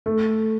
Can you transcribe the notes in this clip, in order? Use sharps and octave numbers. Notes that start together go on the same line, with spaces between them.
A3